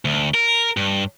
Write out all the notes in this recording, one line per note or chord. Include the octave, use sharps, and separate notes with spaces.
D2
A#4
G2